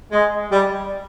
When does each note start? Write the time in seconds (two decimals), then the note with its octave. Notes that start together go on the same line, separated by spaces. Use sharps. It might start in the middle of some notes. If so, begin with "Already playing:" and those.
0.12 G#3
0.51 G3